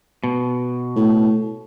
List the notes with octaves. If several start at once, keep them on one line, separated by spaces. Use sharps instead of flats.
B2
A2